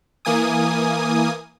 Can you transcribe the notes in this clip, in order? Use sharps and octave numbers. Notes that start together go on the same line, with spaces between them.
E3 A#3 G#5 D#6